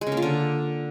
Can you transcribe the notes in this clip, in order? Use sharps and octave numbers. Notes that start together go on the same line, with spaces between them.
G#3
C#3
A#3
F4
D3